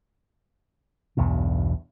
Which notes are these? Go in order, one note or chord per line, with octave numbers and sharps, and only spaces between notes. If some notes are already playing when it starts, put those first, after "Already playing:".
B1 E2 G2 B2